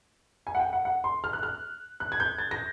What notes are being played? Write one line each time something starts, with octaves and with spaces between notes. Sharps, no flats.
G#5
F#5
G5
F#5
F#5
C6
F6
F#6
F6
F#6
G#6
G6
A6
A#6